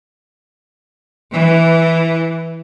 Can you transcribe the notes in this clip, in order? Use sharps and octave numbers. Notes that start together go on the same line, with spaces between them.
E3